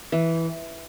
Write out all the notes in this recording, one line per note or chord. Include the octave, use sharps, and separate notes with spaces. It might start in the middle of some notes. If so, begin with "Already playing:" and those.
E3